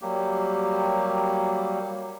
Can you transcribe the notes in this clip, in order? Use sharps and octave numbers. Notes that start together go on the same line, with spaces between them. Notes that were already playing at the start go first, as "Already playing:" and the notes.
F#3 G3 A#3 G4